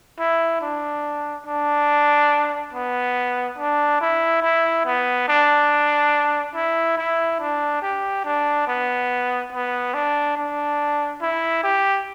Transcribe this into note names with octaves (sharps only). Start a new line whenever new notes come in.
E4
D4
D4
B3
D4
E4
E4
B3
D4
E4
E4
D4
G4
D4
B3
B3
D4
D4
E4
G4